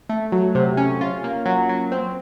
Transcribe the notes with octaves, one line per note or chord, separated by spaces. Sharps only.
A3
F#3
C3
C#4
F4
A#3
F#3
F#3
C4